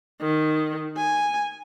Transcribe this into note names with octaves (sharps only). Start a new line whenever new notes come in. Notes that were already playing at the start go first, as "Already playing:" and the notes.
D#3
G#5